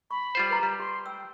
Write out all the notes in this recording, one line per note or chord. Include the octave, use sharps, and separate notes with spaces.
B5 C#6
G3 F4 C5
B4 A#5
G3
G4 C6
G5 E6